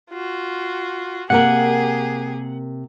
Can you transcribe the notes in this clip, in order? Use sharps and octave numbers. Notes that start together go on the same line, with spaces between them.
F4 F#4
C3 A#3 G4 G#4 A#4 F#5